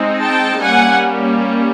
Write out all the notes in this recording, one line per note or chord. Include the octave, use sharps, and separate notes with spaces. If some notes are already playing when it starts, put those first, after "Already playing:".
Already playing: G#3 C4 D#4
G5 A5
G3 A#3 C#4 F#5 G#5